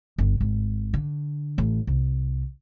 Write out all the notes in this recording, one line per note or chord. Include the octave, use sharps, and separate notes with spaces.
G1
G#1
D3
A1
C2